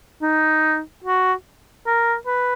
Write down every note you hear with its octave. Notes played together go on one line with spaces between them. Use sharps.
D#4
F#4
A#4
B4